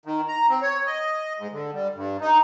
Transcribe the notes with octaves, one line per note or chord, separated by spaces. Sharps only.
D#3
A#5
C4
C#5
D#5
G#2
D3
G3
G2
D#4